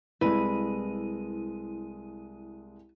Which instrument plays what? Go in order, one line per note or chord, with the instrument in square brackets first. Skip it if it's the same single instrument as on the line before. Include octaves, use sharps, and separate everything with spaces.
[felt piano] C2 G#3 [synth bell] E4 D#7 [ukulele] B4